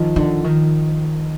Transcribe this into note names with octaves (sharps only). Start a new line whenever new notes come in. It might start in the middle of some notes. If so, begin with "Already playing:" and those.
Already playing: D#3 F3
D3
D#3